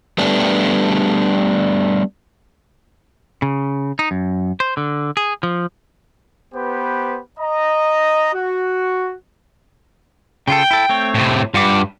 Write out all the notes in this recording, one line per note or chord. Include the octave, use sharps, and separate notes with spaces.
G3 A3 B3 D4
C#3
D#4
F#2
C5
D3
G#4
F3
B3 G4 B4 C5
D#5 A#5
F#4
C#3 F4 A4 G5
E4 A4
A3 C4 C#5
A2 C3
G2 F4 F#5 D6